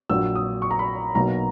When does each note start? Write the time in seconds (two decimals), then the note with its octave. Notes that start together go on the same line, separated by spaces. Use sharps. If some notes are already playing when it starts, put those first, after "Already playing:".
0.10 A#1 A#2 F#3 E6
0.36 D#6
0.62 C#6
0.71 A#5
0.79 B5
1.15 B1 B2 F#3 A#3 A#5